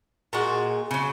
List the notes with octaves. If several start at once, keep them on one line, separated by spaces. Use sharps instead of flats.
A#2 G#3 F#4
C#3 F#3